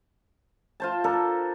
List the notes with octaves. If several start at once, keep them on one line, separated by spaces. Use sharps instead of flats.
F4 C5 A5
D4 A4 A#4